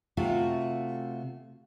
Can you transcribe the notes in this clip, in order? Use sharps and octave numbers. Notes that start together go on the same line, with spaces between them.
C3 A3 F4 F#4